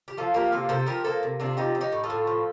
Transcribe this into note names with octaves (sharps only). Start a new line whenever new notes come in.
G4
F3 F4 A4
A#3 G4 A#4
C3 F4 A4
C3 A4 C5
F3 G4 A#4
A#3 A4 C5
C3
C3 D4 F4
F3 D#4 G4
C4
D#4 G4
A2
F4 A4
A2
F3